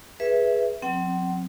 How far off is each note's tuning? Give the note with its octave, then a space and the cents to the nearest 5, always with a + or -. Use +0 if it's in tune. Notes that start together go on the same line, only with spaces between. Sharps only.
G#4 +0 B4 -10 E5 +0
F#3 -40 C4 +0 F#5 +45